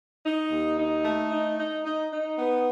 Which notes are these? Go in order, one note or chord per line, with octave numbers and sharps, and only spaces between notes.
D#4
D#2
D#4
A3
D#4
D#4
D#4
D#4
B3